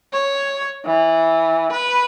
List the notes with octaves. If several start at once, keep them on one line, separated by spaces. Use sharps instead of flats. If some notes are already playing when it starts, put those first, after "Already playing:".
C#5
E3
B4